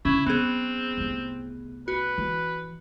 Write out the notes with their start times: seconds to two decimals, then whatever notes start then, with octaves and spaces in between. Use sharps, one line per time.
0.05 C#3 C#4 D4 E4
0.26 F#3 B3 C4 G#4
0.97 C2 A3
1.88 F#4 B4
2.18 E3